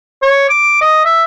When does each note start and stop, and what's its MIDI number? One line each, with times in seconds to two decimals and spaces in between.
0.22 0.48 73
0.50 0.78 86
0.81 1.05 75
1.05 1.24 76